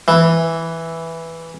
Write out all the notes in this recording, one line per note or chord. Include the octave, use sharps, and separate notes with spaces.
E3